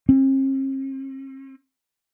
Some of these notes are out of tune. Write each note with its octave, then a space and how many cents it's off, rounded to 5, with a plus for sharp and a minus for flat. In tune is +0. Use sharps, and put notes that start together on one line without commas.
C4 +45